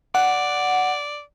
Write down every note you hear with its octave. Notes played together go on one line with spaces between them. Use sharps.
D5 F#5